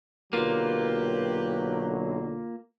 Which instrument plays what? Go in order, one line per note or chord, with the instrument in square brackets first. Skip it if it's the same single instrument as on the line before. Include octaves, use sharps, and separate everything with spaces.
[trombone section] B1 D3 F#3 [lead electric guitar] A#3 F4 [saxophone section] G4 B4 [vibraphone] A#4